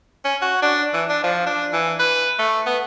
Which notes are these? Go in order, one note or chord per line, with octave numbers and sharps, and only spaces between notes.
C#4
F#4
D4
E3
D4
F3
D4
E3
B4
A3
B3